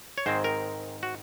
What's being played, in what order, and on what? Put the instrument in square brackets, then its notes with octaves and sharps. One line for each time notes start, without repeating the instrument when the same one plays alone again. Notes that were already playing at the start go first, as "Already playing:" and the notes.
[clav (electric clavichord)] C#5
G#2 D#3 G#3 C4 C5
A#4
F#4